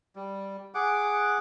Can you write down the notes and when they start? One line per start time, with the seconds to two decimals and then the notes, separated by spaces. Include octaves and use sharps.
0.16 G3
0.75 G#4 F#5 D6